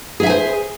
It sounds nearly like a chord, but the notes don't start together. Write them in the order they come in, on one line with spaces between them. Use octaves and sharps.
G#4 E5 G#5 C5